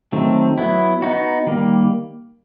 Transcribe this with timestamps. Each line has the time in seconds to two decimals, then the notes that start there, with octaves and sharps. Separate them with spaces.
0.12 D#3 F#3 A3 C4
0.58 F#3 B3 E4
1.02 B3 D#4 F#4
1.47 D#3 G3 A#3